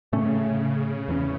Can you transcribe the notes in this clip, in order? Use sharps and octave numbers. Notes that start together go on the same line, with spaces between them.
A2 C#3 A3 C#4
E2 E3 A3 C#4